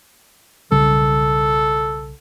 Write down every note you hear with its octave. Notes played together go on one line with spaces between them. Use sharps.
B1 C#3 G3 A4